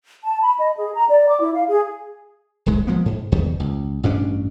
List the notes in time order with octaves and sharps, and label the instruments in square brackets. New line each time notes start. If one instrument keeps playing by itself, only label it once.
[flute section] A5
B5
D#5
G#4
A#5
D5
D6
E4
F5
G#4
[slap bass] D1 C2 G#2 G#3
F3 G#3 A#3 B3
G#2
E1 E2 D#3
C#2
A1 G2 C#4 D4